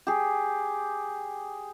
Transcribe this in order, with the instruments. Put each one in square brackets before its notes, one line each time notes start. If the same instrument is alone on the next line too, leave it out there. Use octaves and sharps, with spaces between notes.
[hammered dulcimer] G4 G#4